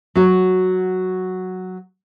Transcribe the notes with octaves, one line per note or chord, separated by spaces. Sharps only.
F#3 F#4